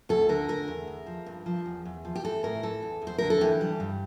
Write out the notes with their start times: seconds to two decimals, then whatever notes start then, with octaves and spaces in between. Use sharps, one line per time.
0.09 D2 A4
0.29 D3 A#4
0.48 E2 A#4
0.68 E2
0.87 E2
1.06 F3
1.26 G2
1.46 F3
1.66 E2
1.85 E2
2.05 F3
2.15 G4
2.24 E3 A4
2.43 A2 A#4
2.63 E3 A4
2.82 E2
3.02 E2
3.07 C5
3.18 D3 A#4
3.30 A4
3.41 E3 G4
3.61 G3
3.80 G2